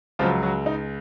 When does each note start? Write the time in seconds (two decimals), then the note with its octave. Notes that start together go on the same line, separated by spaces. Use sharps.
0.19 C#2 C#3 F3 F#3 F4
0.43 F#3 F#4
0.66 D#4